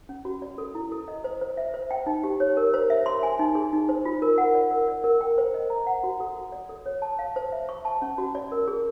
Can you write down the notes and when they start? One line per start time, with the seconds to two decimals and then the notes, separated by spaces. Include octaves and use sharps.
0.09 C#4
0.25 F#4
0.42 D5
0.58 A4
0.75 E4
0.92 A4
1.08 D#5
1.24 C5
1.41 C5
1.57 E5
1.74 C5
1.91 G5
2.06 D#4
2.24 G4
2.40 C#5
2.57 A#4
2.74 C5
2.90 E5
3.06 C6
3.23 G#5
3.39 D#4
3.55 G#4
3.73 D#4
3.89 C5
4.05 F4
4.22 A#4
4.38 F#5
4.55 D5
4.71 A#4
4.88 D5
5.04 A#4
5.21 G5
5.38 C5
5.54 D#5
5.70 A#5
5.86 F#5
6.03 F#4
6.20 A4
6.36 F#4
6.52 D5
6.69 A4
6.86 C#5
7.02 A5
7.19 F5
7.36 C5
7.52 E5
7.69 C#6
7.85 A5
8.02 C#4
8.18 F#4
8.35 D5
8.52 A#4
8.68 G#4